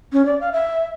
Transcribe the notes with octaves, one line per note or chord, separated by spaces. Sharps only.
C#4
D5
F5
E5